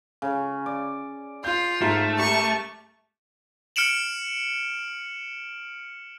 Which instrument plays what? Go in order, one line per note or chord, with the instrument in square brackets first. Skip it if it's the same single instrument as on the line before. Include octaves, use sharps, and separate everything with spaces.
[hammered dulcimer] C#3
D5
[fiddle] F4 [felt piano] G6
[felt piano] G#2 [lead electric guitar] A3 [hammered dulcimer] A#4
[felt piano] G4 [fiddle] C#6
[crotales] F6 C#7 D7 E7 F#7